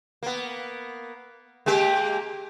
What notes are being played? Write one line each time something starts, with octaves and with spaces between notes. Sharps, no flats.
A#3 B3
G#3 A#3 G4